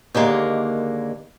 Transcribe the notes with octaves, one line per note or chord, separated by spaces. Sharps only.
D#2 D3 G#3 A#3